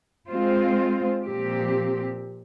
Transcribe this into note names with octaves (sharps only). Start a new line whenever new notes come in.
G#3 C4 F4 C5
A#2 F3 C4 G4